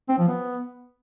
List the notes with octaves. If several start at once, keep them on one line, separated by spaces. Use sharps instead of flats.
C4
F3
B3